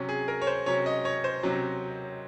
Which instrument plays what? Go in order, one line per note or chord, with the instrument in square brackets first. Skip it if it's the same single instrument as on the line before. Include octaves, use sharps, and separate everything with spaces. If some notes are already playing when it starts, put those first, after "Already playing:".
Already playing: [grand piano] C3 F#3 C#4
G#4
A#4
C#5
C5
C3 F#3 C#4 C#5
D#5
C#5
C5
C3 F#3 C#4